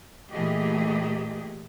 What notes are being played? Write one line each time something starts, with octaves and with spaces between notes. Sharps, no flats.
A#2 E3 A3 G4 G#4 D#5